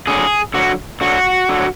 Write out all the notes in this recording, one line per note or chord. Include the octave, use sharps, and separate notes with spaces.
D3 F#3 G#4
D3 F#3 F#4
D3 F#3 F#4
D3 F#3